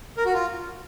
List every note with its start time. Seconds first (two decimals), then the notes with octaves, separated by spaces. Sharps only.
0.17 A#4
0.25 F#4
0.34 F4